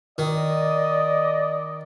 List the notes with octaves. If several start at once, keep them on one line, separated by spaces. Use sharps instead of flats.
D#3 D5 D#5